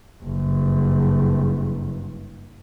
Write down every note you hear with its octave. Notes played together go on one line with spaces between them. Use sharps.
F#1 G2